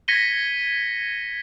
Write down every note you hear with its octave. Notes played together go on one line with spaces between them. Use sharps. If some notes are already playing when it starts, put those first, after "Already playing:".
G#6 A#6 B6 C#7 D#7 G7